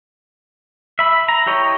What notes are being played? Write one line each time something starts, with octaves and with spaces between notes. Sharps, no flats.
E5 B5
A#5
E4 G4 C#5 D#5